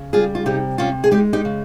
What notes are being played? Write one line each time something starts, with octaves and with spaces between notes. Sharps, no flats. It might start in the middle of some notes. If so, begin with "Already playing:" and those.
Already playing: C#3
G3 F4 G#4
F4
C3 D#4 G4
C3 C#4 F4
G#4
G#3 D#4 G4
D#4 G4
C#3